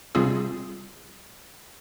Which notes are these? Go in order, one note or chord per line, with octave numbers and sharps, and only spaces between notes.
C3 G3 C4 F4 G#4